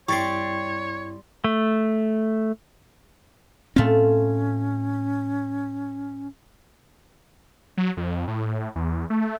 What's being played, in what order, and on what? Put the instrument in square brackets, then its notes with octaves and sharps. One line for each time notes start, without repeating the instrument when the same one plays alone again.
[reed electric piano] G2 E4 [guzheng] G3 C4 [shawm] C#5 [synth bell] C#6 A6 C7
[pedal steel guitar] A3
[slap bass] A2 C4 [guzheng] A3 F4 [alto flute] C#4
[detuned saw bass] F#3
F2
A2
E2
A3